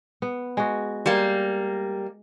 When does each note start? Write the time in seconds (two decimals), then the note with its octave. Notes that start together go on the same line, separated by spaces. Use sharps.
0.22 B3
0.57 G#3 F#4
1.06 G3 A#3